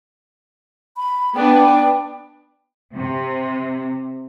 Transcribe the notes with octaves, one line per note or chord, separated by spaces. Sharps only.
B5
B3 D4 B4 G5
C3